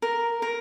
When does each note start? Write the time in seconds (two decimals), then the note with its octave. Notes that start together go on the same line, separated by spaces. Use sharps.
0.02 A#4
0.42 A#4